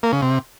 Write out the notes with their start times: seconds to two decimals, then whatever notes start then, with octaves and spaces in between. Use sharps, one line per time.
0.03 A#3
0.13 C#3
0.22 C3